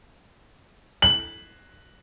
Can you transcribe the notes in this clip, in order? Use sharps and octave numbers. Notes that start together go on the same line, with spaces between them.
F#7